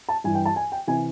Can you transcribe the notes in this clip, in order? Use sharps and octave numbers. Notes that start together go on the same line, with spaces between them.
A5
G2 E3 G#5
G5
A5
G#5
G5
C3 E3 G#5